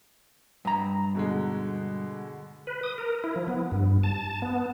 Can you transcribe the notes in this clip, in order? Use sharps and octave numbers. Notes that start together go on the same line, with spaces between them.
G2 A#5
B2 D3 G#3
B4
D#6
A#4
E4
F3
B3
G2
A5
B3